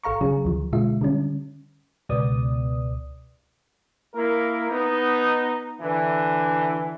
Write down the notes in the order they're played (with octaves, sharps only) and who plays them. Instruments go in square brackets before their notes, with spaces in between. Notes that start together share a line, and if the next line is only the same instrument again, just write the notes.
[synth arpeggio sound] G#1 A4 F5 A#5 C#6
C#3 F#3 C#4 G#4
D2 F3
B2 D3 G#3 F4 E5
D3 G3 C#4
[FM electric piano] C#2 B2 B3 D5 D#6
[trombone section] A#3 E4 A#4
B3 D#4
D3 E3